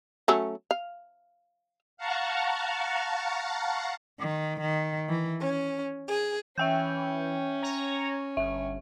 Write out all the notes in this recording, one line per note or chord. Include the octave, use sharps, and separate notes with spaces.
F#3 A3 C#4
F5
F5 F#5 A5 A#5 C#6
D#3
D#3
E3
C#4
G#4
E3 C#4 E5 G5 G6
C#5 A#5
G1 E5